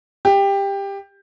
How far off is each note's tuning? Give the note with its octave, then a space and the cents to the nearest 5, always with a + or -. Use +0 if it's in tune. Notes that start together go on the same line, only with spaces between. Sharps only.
G4 +15